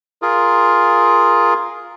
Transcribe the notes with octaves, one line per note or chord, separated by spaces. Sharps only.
F4 G#4 A#4